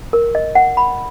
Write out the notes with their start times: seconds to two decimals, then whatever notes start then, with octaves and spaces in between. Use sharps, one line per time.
0.13 A#4
0.35 D#5
0.55 F#5
0.77 B5